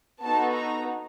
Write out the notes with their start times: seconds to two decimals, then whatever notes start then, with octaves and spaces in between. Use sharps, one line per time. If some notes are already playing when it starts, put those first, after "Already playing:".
0.23 B3 D#4 F#4 A4 A5
0.54 A#5